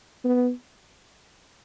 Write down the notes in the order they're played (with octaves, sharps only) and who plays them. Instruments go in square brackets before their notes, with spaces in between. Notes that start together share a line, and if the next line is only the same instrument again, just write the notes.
[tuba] B3